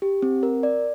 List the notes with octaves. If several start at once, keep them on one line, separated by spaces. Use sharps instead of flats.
G4
C4
A#4
D5